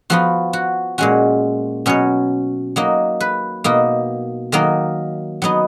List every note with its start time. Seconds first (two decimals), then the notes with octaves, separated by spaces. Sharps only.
0.10 F3 B3 F4 F#4
0.53 F#4
0.98 A#2 G#3 C#4 F#4
1.86 B2 F#3 C#4 C#5
2.76 F#3 A#3 D#4
3.20 B4
3.64 B2 A#3 D#4
4.52 D#3 F#3 A#3 D#4 A#4
5.42 F#3 B3 D#4